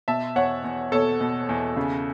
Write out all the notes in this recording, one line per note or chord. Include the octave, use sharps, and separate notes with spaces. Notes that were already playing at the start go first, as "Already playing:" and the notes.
B2 E5 A5
E2 C#5 F#5
E2
B2 A4 C#5
B2
E2
C#3